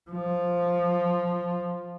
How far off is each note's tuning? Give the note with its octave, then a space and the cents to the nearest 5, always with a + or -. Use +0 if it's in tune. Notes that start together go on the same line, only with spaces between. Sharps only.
F3 +0